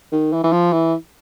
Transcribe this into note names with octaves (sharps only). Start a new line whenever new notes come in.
D#3
E3
E3
F3
E3